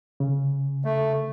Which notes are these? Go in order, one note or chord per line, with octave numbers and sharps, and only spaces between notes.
C#3
A3